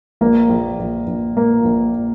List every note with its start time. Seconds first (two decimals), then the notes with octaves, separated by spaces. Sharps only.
0.21 A#1 A#3
0.50 A#1
0.79 A#1
1.07 A#1
1.36 A#2 A#3
1.65 A#1
1.94 A#2